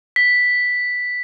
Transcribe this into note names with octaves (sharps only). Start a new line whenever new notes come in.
B6